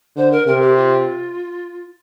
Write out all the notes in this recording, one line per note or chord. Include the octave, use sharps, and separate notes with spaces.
D3 C5
A#4
C3 A#4
G4
F4